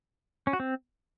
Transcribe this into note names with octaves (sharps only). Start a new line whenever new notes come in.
C#4
F#4
C4